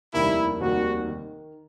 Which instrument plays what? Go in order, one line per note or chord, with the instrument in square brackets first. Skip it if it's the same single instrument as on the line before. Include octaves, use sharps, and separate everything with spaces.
[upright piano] F1 D#2 D#3 G3 A#3 [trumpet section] E4
[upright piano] F1 D#2 D#3 G3 A#3 [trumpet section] F#4
[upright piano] D#3